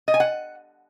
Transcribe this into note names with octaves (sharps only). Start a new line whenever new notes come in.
D#5
G#5
F#5